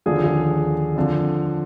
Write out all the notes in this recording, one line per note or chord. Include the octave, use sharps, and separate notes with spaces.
D#2 D3 F3 G#4
G#4
F2 D3 F3